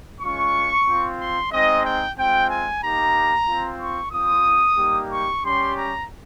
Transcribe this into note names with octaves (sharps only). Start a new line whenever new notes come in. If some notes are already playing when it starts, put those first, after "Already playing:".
G#3 C#4 F4 C#6
C4 F4
C6
G#3 C4 D#4 D#5
G5
G#3 C4 F4 G5
G#5
A#3 D#4 G4 A#5
C4 F4
C#6
C4 F4 D#6
G3 A#3 D#4 G4
C#6
G3 C#4 G4 C6
A#5